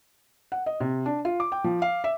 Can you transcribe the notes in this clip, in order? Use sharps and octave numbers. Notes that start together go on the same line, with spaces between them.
F#5
D#5
C3
D4
F4
D6
G5
F3
F5
E5